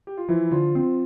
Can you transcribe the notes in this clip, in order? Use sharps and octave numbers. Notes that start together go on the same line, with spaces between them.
G4
F4
E3 F3 E4
D3 F3 F4
C4